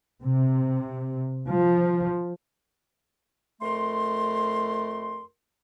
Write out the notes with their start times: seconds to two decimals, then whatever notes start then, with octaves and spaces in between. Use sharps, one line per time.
0.22 C3
1.48 F3
3.61 F2 A3 A#4 C6